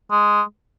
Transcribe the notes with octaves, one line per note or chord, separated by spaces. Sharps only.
G#3